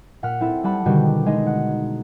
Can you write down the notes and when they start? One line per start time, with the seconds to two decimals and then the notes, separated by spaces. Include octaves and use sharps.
0.23 A#2 F#5 F6 B6
0.40 C4 E4 A4
0.64 G3 F#5 A5 B5
0.86 B2 D3 D#3 G3 F#4 G4
1.26 G#3 D#4
1.46 F#5